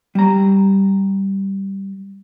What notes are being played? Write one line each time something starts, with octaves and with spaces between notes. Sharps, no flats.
G3 A#5